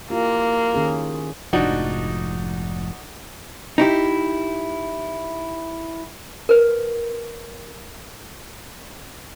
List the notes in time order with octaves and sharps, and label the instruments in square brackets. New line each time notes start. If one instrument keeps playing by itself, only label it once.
[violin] A#3 [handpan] E4 F4 G4
[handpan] D#3 C#4 G#4
[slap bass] F1 G#2 F3 [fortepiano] D4 D#4 F#4
[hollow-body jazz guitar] D#4 E4 G4
[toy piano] A#4 B4